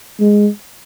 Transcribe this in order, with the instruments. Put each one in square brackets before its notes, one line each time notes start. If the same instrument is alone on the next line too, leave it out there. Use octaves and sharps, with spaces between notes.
[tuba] G#3